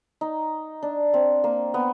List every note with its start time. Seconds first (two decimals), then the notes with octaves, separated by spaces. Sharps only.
0.21 D#4
0.83 D4
1.14 C4
1.44 A#3
1.74 B3